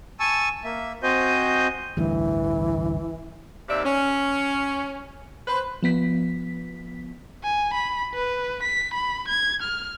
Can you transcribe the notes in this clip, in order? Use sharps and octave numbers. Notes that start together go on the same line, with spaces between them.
G#5 A5 C#6 E6
A#3 E5
C4 F#4 C5 D#5 G#5 G6
A1 D2 G2 E3
D#2 C3 D5 E5
C#4
B4 C5
F3 B3 B6
G#5
B5
B4
B6
B5
G#6
F6